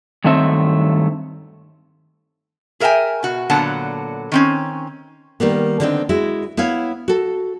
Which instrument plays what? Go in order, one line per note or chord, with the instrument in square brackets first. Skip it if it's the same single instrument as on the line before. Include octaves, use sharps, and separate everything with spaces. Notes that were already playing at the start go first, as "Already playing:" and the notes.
[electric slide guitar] G2 D#3 F#3 A3 C4 E5
[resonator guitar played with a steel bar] G#4 A#4 E5 F5 G5 G#5
B2 F#4
A#2 D3 F#3 B3 F#5 A5
D#3 C4 C#4
[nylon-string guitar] D#3 G3 A#3 B3
D3 D#3 G3 B3 C4 D#4
G#3 E4 F#4
B3 E4 C#5 F5
F#4 A4